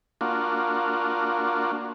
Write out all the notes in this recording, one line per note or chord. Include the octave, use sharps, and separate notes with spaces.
A#3 D4 F4 F#4